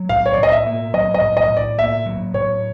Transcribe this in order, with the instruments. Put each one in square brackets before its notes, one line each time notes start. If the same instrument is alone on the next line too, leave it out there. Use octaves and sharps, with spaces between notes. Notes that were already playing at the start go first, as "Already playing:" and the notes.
Already playing: [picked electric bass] F#3
[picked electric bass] A2 [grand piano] F5
[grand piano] C#5
D5
[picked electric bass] A2 [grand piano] D#5
[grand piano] E5
[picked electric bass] A#3
[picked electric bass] F#3 [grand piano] D#5
[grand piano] D#5
[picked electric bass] A2
[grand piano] D#5
[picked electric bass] A2
[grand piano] D5
[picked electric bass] A#3 [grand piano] E5
[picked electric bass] F#3
[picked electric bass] A2 [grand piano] C#5